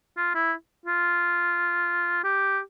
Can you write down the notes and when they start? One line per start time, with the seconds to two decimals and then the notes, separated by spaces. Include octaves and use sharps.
0.17 F4
0.34 E4
0.86 F4
2.24 G4